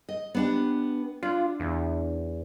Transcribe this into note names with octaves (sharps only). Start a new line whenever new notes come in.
D#5
B3 D4 G4
D4 F4
E2